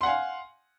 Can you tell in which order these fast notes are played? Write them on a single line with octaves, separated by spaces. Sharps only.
C6 F#5 G#5 F5